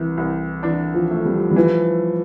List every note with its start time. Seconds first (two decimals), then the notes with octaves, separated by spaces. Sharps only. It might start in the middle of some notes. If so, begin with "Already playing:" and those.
Already playing: C2 E3
0.17 C2
0.63 E3 D4
0.94 F3
1.10 A3
1.25 G3
1.51 G3
1.56 E3 F3